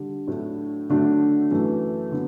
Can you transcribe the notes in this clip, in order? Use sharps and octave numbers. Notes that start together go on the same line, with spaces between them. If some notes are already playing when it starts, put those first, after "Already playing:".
Already playing: D3 G3
A2 F#3 A3 D4
D3 F#3 A3 D4
F#2 E3 A3
D3 F#3 B3